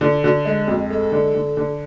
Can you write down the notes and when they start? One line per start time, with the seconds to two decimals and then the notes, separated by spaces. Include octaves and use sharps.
0.01 D3 F4
0.23 D3 F#4
0.45 G#3 G#4
0.63 G#4
0.68 F2 F#4
0.90 G#3 A4
1.12 D3
1.35 D3
1.57 D3